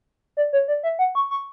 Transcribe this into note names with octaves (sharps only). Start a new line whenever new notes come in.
D5
C#5
D5
E5
F#5
C#6
C#6